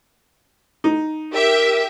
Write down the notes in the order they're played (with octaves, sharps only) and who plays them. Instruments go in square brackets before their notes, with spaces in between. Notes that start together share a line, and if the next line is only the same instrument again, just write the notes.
[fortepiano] D#4
[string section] G4 E5 [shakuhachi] A#4